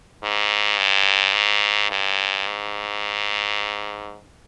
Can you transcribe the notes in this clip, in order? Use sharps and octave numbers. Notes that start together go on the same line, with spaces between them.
G#2
G2
G#2
G2
G#2